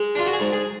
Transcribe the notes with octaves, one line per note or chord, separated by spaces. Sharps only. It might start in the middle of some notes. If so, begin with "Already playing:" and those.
Already playing: G#3
D4 F4
F#4
G#4
G#2
G#4